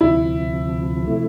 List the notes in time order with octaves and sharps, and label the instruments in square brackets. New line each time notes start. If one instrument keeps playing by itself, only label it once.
[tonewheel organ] D2 C3 F3 [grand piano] E4
[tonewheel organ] C3 F3 A3 E4